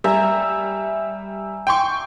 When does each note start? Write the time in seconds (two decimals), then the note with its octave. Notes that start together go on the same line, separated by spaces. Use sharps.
0.04 G3 E5 G#5 A#5
1.67 G5 C6 C#6